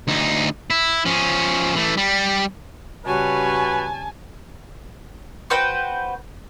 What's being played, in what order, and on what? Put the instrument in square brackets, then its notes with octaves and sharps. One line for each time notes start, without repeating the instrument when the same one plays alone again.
[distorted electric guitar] D2 D#4
E4
F3 C#4
E3 A3
G3
[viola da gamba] C#3 G3 C#5 [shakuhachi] F#4 [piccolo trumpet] B4 [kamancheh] G#5 A5
[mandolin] F#4 B4 C5 G5